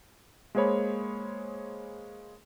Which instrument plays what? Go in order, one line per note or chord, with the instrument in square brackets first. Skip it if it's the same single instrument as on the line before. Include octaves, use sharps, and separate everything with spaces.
[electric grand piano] G#3 A#3 G#4 C5 C#5 B5